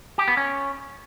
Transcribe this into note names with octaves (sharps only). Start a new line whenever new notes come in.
G4
B3
C#4